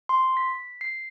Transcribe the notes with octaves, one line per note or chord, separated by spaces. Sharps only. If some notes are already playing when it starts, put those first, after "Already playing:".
C6
B6
C7